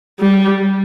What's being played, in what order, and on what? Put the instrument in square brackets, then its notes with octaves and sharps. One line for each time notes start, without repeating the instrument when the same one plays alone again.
[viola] G3